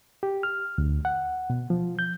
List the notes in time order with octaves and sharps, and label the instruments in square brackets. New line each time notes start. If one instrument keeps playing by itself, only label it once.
[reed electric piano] G4
F6
D2
F#5
B2
F3
G6